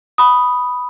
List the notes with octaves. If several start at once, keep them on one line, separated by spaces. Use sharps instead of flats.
B5 D#6